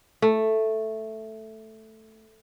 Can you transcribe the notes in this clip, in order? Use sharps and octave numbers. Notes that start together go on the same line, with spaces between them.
A3